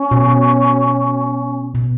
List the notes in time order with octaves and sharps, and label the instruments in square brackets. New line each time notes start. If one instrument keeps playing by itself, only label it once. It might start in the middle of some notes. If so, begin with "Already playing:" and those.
Already playing: [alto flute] C#4
[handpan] B2
B2